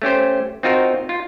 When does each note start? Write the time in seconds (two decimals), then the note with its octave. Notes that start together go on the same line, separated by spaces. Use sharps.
0.02 A3 C#4 G4 C5
0.63 C4 D#4 F4 F#4 A#4
1.09 F4